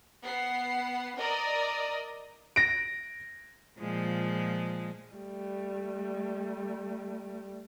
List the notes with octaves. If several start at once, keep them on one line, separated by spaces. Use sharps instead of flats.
B3 F#5 C7
A#4 D5 D#5 A#5 D#6
A#6 D7
A#2 F3 G#3
G3 A3